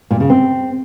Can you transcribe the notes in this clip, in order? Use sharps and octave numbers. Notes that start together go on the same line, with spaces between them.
A#2
C#3
C4